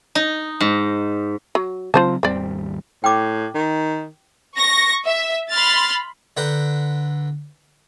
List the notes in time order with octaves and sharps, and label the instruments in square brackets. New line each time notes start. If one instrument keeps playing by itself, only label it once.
[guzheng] D#4
G#2
[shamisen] F#3
[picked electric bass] C#3 F#3 C4 [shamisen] F4 C5 A5
[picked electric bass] G#1 D#2 G3 [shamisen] C4 D5
[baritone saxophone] A2 [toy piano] G5 D6
[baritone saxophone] D#3
[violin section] C#6 A#6
E5
B5 C6 F6 A6
[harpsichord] D3 D4 B4 G5 A#5